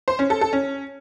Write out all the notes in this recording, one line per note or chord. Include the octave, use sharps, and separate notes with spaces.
C5
C#4
A4
A4
C#4